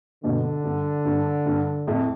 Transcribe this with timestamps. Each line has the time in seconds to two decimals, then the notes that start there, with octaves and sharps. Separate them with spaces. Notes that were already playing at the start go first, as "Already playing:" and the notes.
0.23 G2 B2 D3
0.64 G2
1.05 G2
1.46 G2
1.87 F2 A2